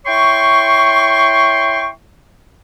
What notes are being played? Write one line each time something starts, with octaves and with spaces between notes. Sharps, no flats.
E4 C#5 G5 C6 C#6